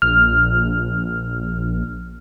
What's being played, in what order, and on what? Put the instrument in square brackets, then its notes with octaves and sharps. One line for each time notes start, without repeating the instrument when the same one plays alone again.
[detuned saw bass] A#1 [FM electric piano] F6